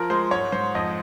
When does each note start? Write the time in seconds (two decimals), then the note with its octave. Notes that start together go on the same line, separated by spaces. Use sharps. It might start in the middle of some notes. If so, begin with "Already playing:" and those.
Already playing: F3 A#4
0.10 G#3 C5
0.31 G#2 C#5
0.52 G#2 C5
0.75 F2 D#5